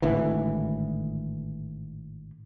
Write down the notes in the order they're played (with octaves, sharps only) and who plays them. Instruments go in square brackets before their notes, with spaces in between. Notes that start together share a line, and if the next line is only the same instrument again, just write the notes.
[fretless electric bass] G#1 A2 D3 E3